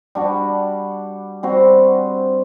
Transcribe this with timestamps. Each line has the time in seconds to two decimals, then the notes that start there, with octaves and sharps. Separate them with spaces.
0.15 G3 D4 F#4
1.43 G3 C4 F#4 C5